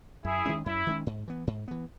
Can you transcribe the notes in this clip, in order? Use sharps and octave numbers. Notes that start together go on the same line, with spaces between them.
F#2 E4 G#4
D#3 G#3 C#4
F#2 E4
D#3 G#3 C#4
G#2
E3 B3
G#2
E3 B3